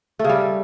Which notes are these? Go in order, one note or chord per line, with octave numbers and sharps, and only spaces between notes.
A3
C#3
G3